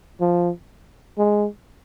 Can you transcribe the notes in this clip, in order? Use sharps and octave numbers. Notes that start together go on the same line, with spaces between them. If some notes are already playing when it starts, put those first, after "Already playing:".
F3
G#3